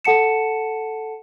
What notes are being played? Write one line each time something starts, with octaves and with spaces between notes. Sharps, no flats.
A4 F#5 A5 C#7 E7